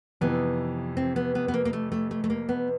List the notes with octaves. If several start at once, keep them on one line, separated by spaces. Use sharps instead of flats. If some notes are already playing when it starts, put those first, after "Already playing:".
F2 C3 E3 B3
C4
B3
B3
B3
A#3
A#3
A3
A3
A3
A3
A#3
B3